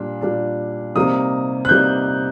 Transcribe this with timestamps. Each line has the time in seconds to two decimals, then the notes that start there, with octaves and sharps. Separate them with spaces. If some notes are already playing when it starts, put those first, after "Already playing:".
Already playing: A#2 G3 D4
0.21 A#2 G3 D4
0.95 C3 G3 A#3 D#4 D#6
1.65 F#6
1.69 C3 G3 A#3 D#4 G6